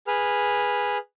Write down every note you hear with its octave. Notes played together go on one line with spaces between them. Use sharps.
G#4 B4 F6